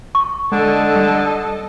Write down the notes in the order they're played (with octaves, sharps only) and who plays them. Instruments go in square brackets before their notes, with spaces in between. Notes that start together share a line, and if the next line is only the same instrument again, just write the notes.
[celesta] C#6
[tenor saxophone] D3 [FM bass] G#3 [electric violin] A4 D#5
[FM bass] G3